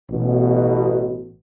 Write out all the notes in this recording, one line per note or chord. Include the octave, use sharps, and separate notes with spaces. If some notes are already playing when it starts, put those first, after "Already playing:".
A1 B2